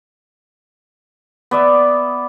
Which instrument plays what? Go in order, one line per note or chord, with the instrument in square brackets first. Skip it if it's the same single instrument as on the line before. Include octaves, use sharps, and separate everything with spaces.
[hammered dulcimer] B3 D5 E5